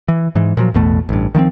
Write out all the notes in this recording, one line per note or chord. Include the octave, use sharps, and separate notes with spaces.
E3
G#2 E3
A#2 F3 F#3
A1 E2 B2 A3
A1 G2
D#3 F3 A#3 C4